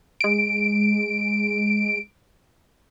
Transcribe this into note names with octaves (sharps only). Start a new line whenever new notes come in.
G#3 D7